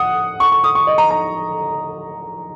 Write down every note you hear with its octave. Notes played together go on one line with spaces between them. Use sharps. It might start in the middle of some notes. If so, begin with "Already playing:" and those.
Already playing: F#5 D#6
C#6
C#6
D#6
C#6
D#5
A#5
A#5